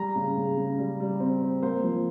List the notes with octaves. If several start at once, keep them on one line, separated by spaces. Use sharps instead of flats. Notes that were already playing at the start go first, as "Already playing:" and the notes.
Already playing: G3 A#5
C#3
C#3
C#3
G3
G3
C4
C4
A#3 C5
F3